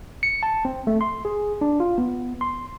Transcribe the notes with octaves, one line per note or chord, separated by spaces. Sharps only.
C#7
A5
C4
A3
C6
G#4
D4
F4
B3
C6